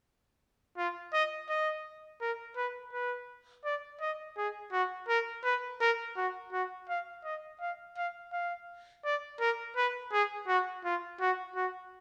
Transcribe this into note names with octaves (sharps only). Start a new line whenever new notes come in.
F4
D#5
D#5
A#4
B4
B4
D5
D#5
G#4
F#4
A#4
B4
A#4
F#4
F#4
F5
D#5
F5
F5
F5
D5
A#4
B4
G#4
F#4
F4
F#4
F#4